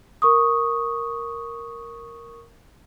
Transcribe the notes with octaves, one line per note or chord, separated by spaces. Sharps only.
A#4 C#6 D#6